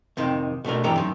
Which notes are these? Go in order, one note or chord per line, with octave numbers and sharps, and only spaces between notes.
F2 C3 D#3
B2 A3 D4 A#4
C2 G2 E3 G4 A#5
F#2 D#3